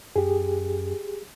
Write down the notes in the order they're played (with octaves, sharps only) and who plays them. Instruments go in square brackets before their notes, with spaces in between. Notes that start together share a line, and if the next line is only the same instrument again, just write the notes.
[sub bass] F#2 [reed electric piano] G4 G#4